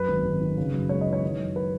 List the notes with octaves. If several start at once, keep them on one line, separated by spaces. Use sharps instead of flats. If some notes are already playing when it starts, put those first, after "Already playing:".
Already playing: F#2 B4
G#1
G#1
D#3
C#3
F#2
G#3 C#5
D#5
E3
C#5
D#3
F#2
B4